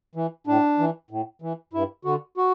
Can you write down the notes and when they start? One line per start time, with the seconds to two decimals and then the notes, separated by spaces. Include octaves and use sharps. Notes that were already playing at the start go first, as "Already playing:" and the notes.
0.15 E3
0.47 A2 D4
0.79 E3
1.11 A2
1.42 E3
1.73 G2 E4
2.05 D3 F#4
2.37 F#4